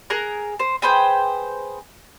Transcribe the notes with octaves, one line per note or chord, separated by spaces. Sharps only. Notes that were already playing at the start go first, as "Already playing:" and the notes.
G#4 A#4 F#6
C5
G#4 B4 C5 G5